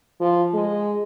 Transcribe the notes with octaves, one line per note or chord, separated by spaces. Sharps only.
F3
G#3